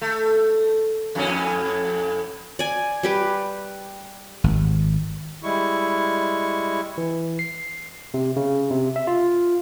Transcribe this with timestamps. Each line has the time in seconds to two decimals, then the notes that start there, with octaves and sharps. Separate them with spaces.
0.02 A3
1.15 F2 A2 C#4
2.59 D5 G#5
3.03 G3 G4 B4
4.44 G#1
5.43 G3 G#3 E4 C#6
6.98 E3
7.39 C7
8.14 C3
8.36 C#3
8.71 C3
8.96 E5
9.07 F4